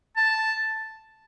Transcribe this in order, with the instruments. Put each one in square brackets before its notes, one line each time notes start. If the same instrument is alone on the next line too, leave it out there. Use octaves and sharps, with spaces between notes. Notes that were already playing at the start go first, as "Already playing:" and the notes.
[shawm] A5